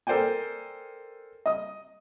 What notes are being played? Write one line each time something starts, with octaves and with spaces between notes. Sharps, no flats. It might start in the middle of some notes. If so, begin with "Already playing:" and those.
A4 A#4 C5 D5 G5 G#5
D#5 D#6